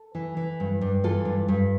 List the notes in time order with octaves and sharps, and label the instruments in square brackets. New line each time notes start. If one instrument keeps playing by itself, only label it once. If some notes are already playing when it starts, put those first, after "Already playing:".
Already playing: [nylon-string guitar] A4
E3
E3
G2
G2
E3 F4 A4
G2
G2